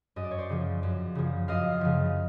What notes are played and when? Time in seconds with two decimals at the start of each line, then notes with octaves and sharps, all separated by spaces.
0.16 F#2 D#5
0.24 D5
0.31 C#5
0.38 C5 D5
0.49 C#3 F3
0.83 F#2
1.15 C#3 F3
1.48 F#2 D#5 F5
1.81 C#3 F3